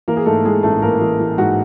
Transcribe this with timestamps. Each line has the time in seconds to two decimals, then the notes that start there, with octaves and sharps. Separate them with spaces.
0.08 E3 A#3 A#4
0.16 G#4
0.26 G#2 A3 A4
0.45 E3 G#3 G#4
0.63 A1 A3 A4
0.82 A1 A#3 A#4
1.01 E3
1.20 E3
1.38 G#2 F#4